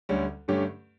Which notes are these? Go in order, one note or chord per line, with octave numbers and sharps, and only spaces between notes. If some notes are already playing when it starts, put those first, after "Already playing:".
D2 D3 G3 C#4
G2 D3 A3 C#4 G4